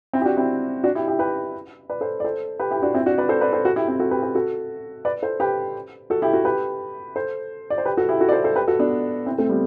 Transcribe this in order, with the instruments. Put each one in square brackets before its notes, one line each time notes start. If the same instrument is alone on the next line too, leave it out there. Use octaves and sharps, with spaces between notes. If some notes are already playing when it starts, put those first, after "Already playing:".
[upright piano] C4 E4
G4
D4 F#4
C4 E4
D4 F#4
E4 G4
E4 G4
G4 B4
B4 D5
A4 C5
D5
A4 C5
G4 B4
E4 G4
D4 F#4
C4 E4
D4 F#4
B4 D5
A4 C5
B4 D5
A4 C5
F#4 A4
E4 G4
C4 E4
F#4 A4
G4 B4
G4 B4
F#4 A4
B4 D5
A4 C5
G4 B4
F#4 A4
E4 G4
F#4 A4
G4 B4
A4 C5
D5
C5
G4 B4
F#4 A4
E4 G4
F#4 A4
D5
A4 C5
A4 C5
G4 B4
F#4 A4
B3 D4
C4 E4
A3 C4
G3 B3